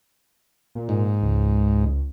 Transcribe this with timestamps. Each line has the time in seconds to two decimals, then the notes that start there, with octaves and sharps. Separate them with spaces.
0.75 A#2
0.89 G#2
1.22 C#2